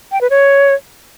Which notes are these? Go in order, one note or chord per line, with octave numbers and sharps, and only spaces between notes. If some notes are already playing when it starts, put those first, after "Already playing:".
G5
B4
C#5